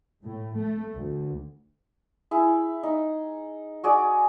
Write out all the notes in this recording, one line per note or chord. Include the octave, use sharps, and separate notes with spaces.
A2
A3
D2
E4 G#4
D#4
F#4 G#4 D5